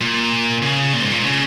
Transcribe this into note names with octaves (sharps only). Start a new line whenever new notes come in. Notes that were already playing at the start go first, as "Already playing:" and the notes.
A#2
C#3
A#2
G#2
A#2
C#3